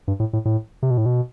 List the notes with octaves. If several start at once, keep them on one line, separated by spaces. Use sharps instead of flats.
G2
A2
A2
A2
C3
B2
A2
B2